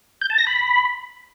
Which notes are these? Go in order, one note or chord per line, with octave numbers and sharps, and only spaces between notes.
G6
A5
A#6
B5